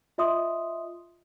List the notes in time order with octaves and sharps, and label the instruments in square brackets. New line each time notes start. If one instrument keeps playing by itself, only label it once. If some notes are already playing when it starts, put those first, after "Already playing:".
[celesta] F4 D#5 E5 C6 D#6